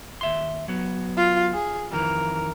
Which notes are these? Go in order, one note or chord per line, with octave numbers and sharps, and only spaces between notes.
D#2 E5 C6
F#3 B3
F4
G#4
F2 D#3 E3 A#4